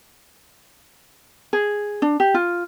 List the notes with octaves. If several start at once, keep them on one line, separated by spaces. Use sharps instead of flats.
G#4
D4
G4
F4